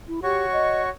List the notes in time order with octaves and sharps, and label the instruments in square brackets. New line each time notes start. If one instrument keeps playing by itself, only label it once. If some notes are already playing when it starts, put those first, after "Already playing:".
[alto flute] E4
[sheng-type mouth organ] F#4 C#5 [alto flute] G4
[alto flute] D#5